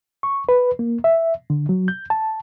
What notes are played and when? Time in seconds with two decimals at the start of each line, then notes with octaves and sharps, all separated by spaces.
0.23 C#6
0.49 B4
0.79 A#3
1.04 E5
1.50 D3
1.69 F#3
1.88 G6
2.10 A5